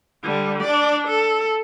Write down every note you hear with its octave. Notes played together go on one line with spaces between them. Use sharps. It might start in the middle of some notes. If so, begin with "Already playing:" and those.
D3 G3
D4 D5
A4